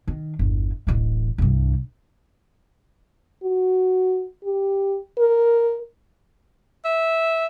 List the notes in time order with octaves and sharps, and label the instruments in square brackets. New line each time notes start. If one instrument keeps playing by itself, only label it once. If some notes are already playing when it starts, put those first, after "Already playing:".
[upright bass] D#3
G1 E2
D1 A1
C2 G2
[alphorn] F#4
G4
A#4
[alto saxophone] E5